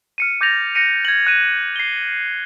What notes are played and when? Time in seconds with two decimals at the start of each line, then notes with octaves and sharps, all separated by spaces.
0.18 F6 C#7 D#7
0.41 D6 G6 A6 A#6 F7
0.75 F#6 A#6 C#7 D#7
1.05 G#6 F#7
1.27 F#6 D#7
1.76 C7 G7